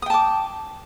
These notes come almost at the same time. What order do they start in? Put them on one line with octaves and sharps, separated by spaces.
D#6 G5 A5 D6